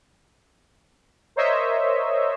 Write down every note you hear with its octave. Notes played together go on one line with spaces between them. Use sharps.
A#4 C5 C#5 D#5 E5